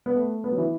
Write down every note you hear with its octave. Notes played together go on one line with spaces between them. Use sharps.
B3
A3
B3
F#3
E3